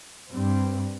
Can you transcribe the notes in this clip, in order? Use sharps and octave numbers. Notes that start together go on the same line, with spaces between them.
G2 G3 C4